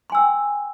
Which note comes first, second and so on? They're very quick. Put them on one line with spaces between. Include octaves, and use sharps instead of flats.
C6 G#5 E6 G5